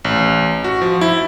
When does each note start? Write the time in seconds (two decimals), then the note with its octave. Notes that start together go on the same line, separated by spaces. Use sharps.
0.05 A1
0.64 F#4
0.82 F3
1.01 E4